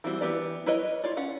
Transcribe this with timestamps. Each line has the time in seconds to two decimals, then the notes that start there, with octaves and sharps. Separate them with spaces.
0.04 E3 G3 C4 F#4
0.21 E3 B3 G4 D5
0.66 E4 A#4 B4 C#5 D#5
1.04 F4 C#5 D5
1.17 C#4 F#5